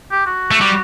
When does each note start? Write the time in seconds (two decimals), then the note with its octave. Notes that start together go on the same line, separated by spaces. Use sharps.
0.12 G4
0.26 F#4
0.51 A3
0.61 G3